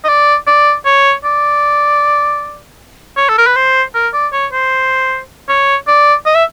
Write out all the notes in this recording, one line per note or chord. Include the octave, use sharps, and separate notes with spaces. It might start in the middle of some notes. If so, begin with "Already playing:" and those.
D#5
D5
D5
C#5
D5
C#5
A4
A#4
B4
C5
A#4
D5
C#5
C5
C#5
D5
D#5
E5